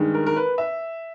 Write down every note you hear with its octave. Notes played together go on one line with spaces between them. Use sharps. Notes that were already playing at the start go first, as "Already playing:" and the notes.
Already playing: G2 D#3 G#3
A#4
A#4
B4
E5